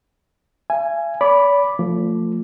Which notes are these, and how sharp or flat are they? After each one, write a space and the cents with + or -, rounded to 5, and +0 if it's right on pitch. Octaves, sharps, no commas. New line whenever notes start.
E5 +45 G#5 +0
D5 -45 B5 +0 D6 +0
F3 +0 A3 +25